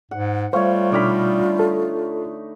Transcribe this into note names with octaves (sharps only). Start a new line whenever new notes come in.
G#2 F#5
G3 A3 F4 C5 C#5 F5
B2 D3 D#4 B5 D6 F6
A4